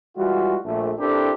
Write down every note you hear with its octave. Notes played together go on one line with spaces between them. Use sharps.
E3 G3 G#3 F4 F#4
A#1 A3
C4 D4 E4 G4 A4 A#4